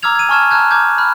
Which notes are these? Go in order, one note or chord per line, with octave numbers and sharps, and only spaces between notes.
A#5 D6 E6 F6 G#6 F7
G#6 D#7
G#5 A5 C#6 F6 G#6 E7
A5 A#5 F6 F#6 G#6
A#5 D6 F6 G6 G#6
B5 F6 F#6